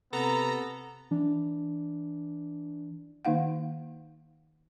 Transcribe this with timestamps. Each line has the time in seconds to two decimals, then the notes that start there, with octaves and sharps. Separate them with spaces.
0.13 C3 B3 A4 A#5
1.11 E3 D4
3.25 D#3 A#3 D#4 F5 F#5